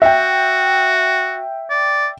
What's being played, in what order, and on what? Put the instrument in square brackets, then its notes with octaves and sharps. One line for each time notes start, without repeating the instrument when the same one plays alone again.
[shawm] F#4 [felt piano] E5 G5
[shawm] D5